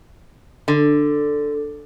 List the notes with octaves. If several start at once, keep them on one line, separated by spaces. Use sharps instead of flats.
D3